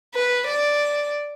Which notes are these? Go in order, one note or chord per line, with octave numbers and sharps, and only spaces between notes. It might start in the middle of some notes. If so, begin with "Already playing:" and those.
B4
D5